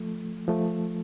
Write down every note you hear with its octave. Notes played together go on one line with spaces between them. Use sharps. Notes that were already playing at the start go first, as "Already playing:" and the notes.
Already playing: F3 A3
F3 A3